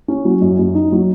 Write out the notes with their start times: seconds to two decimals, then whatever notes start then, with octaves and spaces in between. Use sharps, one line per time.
0.08 C#4
0.25 F#3
0.41 F#2
0.59 F#2
0.74 D#4
0.92 F#3